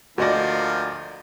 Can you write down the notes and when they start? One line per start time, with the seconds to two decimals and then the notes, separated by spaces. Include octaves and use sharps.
0.18 D2 F3 A#3 F#4 D5 D#5 A#6